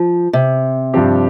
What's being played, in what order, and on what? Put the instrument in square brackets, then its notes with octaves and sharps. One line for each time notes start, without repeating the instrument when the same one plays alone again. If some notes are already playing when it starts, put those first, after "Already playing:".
Already playing: [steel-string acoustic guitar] F3
C3
[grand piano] G2 F3 C4 G4